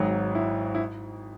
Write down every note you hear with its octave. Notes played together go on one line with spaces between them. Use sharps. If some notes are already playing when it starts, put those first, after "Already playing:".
Already playing: G#1 G#2 F#3
E4
E4